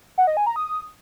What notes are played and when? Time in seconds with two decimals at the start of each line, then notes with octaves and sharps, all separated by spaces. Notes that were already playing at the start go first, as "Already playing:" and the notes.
0.18 F#5
0.27 D#5
0.37 G#5
0.46 A#5
0.56 D#6